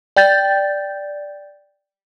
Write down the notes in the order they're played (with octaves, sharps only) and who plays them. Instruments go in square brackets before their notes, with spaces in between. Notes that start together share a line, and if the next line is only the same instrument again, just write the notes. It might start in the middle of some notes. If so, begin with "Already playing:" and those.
[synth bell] D5 G5 G6 A6